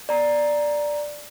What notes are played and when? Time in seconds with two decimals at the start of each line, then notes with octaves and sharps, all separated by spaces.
0.09 D5 A#5